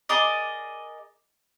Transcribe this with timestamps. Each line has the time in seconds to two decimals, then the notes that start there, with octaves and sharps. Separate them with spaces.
0.09 G#4 A#4 D5 D#5